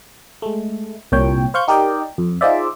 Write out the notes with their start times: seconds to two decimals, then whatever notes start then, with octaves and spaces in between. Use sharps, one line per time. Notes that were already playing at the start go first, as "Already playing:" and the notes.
0.42 G#3 A3
1.12 C2 A#2 C#5 G5
1.54 C5 F5 C#6 G6
1.68 D#4 G4 A#4 D5 D#5 G5
2.18 F2
2.41 D#4 F4 G#4 C5 D5 E5